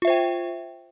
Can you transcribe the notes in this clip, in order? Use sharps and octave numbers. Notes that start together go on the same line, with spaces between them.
F4 C5 E5 G5